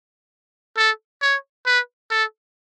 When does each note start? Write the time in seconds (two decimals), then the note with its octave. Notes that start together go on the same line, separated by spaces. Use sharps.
0.77 A4
1.22 C#5
1.66 B4
2.11 A4